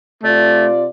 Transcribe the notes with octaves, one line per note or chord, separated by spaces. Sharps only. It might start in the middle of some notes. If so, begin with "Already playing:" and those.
C3 A3 F4 D5